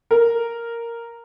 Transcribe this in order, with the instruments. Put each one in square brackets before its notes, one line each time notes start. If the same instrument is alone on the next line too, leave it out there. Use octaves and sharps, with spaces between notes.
[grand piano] A#4